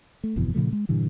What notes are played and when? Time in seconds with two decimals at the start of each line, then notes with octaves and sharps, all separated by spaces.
0.24 A3
0.36 G1 F2 B2 E3
0.54 A#2 C#3 F3 A3
0.73 G#3
0.89 G2 A#2 D3 E3